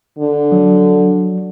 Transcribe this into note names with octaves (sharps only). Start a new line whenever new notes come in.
D3
F#3